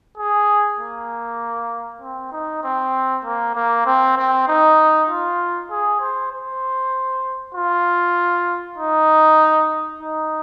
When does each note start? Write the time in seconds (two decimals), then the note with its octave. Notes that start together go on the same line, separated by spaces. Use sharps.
0.17 G#4
0.79 A#3
2.02 C4
2.32 D#4
2.63 C4
3.25 A#3
3.55 A#3
3.86 C4
4.17 C4
4.48 D#4
5.09 F4
5.71 G#4
6.01 C5
6.32 C5
7.54 F4
8.78 D#4
10.00 D#4